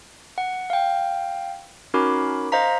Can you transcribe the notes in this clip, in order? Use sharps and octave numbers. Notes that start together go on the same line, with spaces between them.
F#5
F5 G5
C#4 D#4 F#4 A#4 B5 D6
C5 D#5 F5 A#5 B6